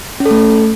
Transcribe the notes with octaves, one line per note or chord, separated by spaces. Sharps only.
C#4
A4
A3